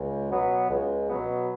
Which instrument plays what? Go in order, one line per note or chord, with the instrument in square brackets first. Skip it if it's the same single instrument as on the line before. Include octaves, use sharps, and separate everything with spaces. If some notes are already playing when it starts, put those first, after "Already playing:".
Already playing: [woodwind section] C#2
B2 F#3 B3
C#2
B2 F#3 B3